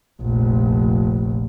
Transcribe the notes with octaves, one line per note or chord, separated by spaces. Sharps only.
F1 A#1